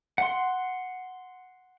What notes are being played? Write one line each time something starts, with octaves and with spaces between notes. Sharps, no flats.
F#5 C6